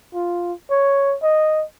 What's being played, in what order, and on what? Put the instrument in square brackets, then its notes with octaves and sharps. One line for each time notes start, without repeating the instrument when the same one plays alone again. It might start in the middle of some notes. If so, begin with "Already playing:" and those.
[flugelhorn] F4
C#5
D#5